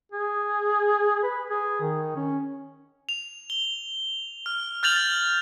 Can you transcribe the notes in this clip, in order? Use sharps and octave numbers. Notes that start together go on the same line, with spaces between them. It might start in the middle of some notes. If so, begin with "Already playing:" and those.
G#4
B4
G#4
D#3
C#4
F7
G7
F6
F6 G6 A6 F7 F#7